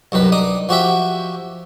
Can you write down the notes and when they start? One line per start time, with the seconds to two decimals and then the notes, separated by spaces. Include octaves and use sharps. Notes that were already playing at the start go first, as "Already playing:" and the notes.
0.12 C2 F#2 D#3 B4
0.32 D4 D#4 D#6
0.69 F3 F#4 G4 E5